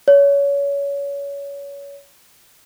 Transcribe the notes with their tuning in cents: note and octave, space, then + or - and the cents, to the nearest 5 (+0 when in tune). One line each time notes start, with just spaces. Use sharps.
C#5 +25